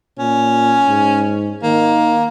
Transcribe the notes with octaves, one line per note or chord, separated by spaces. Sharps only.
A#2 C#4
G#2
D#3 A#3